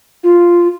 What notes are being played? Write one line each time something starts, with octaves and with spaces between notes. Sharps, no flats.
F4